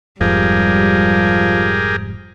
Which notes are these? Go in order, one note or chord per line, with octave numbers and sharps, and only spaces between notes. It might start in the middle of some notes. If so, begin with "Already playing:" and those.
F1 F2 G#2 F3 G3 G4 G#4 A#4